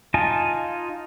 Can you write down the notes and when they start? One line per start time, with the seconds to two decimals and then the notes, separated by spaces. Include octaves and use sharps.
0.14 D#4 F4 D#5 G#5 A5